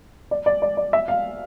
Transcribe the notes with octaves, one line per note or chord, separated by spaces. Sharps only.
D5
D5
D5
D5
E5
F5